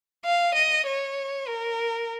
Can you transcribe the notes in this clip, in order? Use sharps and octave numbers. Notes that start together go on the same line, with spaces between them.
F5
D#5
C#5
A#4